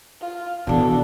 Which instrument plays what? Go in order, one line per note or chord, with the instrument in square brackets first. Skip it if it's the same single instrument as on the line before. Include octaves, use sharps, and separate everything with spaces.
[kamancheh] F4
[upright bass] B2 E3 [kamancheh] D4 A4